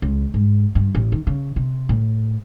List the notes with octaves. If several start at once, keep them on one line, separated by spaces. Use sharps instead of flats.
C#2
G#2
G2
A1
D#3
C#3
C3
A2